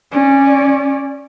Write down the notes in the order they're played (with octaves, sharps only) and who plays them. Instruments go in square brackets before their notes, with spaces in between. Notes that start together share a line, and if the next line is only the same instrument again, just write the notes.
[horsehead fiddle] C#4 D5